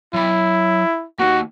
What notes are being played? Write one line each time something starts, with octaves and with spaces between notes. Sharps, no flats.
F#3 E4 B5
A#3 D#4 F#4